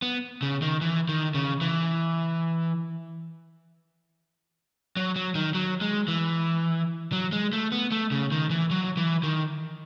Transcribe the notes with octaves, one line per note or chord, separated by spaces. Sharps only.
B3
C#3
D#3
E3
D#3
C#3
E3
F#3
F#3
D#3
F#3
G#3
E3
F#3
G#3
A3
B3
A3
C#3
D#3
E3
F#3
E3
D#3